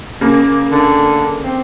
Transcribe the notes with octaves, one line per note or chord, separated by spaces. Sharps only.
C#3 A#3
D3
C4